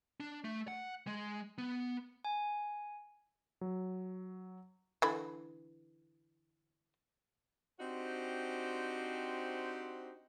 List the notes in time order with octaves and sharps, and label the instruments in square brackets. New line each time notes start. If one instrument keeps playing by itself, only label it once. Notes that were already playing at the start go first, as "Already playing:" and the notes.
[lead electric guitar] D4
A3
F#5
G#3
B3
[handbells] G#5
[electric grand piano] F#3
[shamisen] D3 E3 B5
[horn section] C4 D4 D#4 F#4 G4 C5